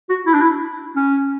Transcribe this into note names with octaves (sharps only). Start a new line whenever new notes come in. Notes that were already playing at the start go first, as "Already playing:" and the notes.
F#4
E4
D4
E4
C#4